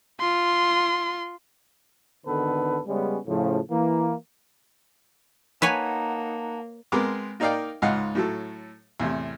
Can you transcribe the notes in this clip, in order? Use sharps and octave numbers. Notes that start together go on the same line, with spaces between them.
F4 C6
G#1 D3 D#3 B3 A4 B4
C#3 G3 G#3 B3 C#4
A2 C#3 F3
E3 A#3
A#3 D#4 B4 C#5 F#5 G#5 A5
G#3 B3 C4 A#4 D6
A#3 D#4 A#4 D5 F5 G5
C#2 G#2 D#4 F5 F#5
A2 F#3 A4
E2 A2 C3